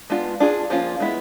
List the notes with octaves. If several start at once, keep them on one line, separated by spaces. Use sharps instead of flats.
G#3 B3 D4 F4
D4 F4 G#4
F3 A#3 C#4 F4
G#3 B3 E4